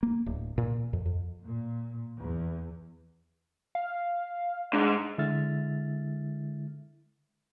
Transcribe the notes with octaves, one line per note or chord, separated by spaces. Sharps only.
A#3
D1
A#2
F2
F2
A#2
E2
F5
G#2 D4
D3 G#3 E4 E5 F6 A6